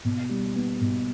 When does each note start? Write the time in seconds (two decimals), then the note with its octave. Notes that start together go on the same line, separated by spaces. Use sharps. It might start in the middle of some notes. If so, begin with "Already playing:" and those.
0.05 B2
0.29 G3
0.55 B3
0.81 B2